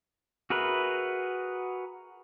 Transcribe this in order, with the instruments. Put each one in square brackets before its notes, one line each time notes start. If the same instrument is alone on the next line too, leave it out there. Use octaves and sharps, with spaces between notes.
[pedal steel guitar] F#4 G#4 A#4 B4 E5